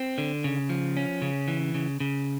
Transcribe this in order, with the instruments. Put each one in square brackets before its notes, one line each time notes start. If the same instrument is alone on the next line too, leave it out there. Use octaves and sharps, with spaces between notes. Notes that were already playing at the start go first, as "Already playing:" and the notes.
Already playing: [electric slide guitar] C4
D3
C#3
F3
C#4
C#3
E3
C#3
C#3